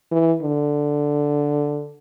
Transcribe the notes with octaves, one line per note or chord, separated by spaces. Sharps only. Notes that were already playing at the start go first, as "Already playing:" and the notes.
E3
D3